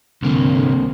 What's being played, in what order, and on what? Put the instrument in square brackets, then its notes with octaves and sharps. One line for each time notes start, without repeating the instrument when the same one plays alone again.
[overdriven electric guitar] C2 A#3 [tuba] D3 [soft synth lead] C4